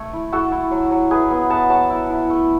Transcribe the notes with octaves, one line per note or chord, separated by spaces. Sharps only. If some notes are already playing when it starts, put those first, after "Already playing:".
Already playing: A3 C#5
E4
E4 F#4 A4
E4
F#3
F#3
E4 G#4 B4
B3
B3 F#5 A5
F#3 F#5 A5
E4
E4
A3